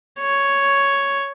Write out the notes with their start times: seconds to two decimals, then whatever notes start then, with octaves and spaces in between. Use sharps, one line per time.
0.20 C#5